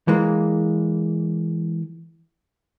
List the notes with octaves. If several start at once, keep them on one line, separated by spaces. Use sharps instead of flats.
E3 G#3 A#3